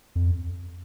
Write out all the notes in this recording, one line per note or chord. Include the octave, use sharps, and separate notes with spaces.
F2